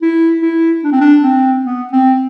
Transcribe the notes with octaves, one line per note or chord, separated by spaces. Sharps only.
E4
E4
D4
C4
D4
C4
B3
C4